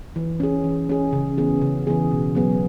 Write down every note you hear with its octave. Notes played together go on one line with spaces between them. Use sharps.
E3
C#4 G#4
E3
C#4 G#4
C#3
E3 B3 G#4
C#3
E3 B3 G#4
B2
F#3 B3 G#4